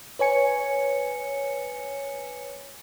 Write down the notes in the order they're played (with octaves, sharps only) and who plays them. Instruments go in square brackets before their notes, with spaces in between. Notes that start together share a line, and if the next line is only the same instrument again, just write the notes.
[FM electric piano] B4 C#5 G#5 C#7